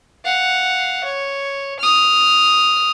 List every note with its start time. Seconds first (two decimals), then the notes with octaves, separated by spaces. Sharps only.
0.25 F5 F#5
1.04 C#5
1.79 D#6 F6